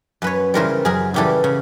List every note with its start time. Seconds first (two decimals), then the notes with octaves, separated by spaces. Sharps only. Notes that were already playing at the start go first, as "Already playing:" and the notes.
0.22 F#2 B4 C#5
0.54 C#3 E3 G3 A#4 C5
0.85 F#2 G#4 A#4
1.14 C#3 E3 G3 G4 A4
1.44 C#3